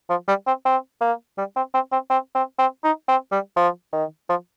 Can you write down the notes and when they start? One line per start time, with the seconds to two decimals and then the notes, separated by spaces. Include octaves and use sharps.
0.10 F3
0.28 G3
0.47 C4
0.65 C4
1.01 A#3
1.38 G3
1.56 C4
1.74 C4
1.92 C4
2.10 C4
2.35 C4
2.58 C4
2.84 D#4
3.08 C4
3.32 G3
3.56 F3
3.93 D#3
4.29 F3